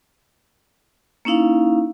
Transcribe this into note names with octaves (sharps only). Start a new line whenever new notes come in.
A#3 C#4 D#4 E4 F5